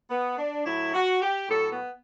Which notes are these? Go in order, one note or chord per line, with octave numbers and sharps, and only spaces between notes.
B3
D4
A2 F#3 E4
F#4
G4
A2 F#3 A4
B3